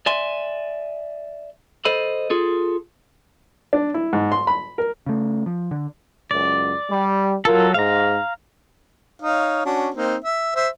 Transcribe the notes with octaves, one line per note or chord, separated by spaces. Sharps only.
D5 E5 G#5 C6
A4 C5 D#5 B5
F4 G#4 A4
D4
E4
G#2
C6
B5
A#4
C#3 A3
F3
D3
C#2 F#2 D5
G3
F#3 F4 A4 A#4
G#2 F5 A#5
D#4 C#5 F5
C#4 D4 F#4
A#3 C4 D#4
E5
C5 E5